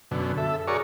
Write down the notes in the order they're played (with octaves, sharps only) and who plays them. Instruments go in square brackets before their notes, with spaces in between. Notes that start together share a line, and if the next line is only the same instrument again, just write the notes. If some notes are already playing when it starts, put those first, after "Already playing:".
[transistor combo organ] F#2 B2 D3
A4 E5
F#4 G#4 A#4 C#5 D5 C#6